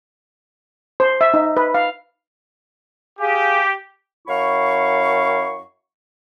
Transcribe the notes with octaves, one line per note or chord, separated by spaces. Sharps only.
C5
E5
D#4
B4
F5
G4 G#4 F5 G#5
F#2 E4 F5 C#6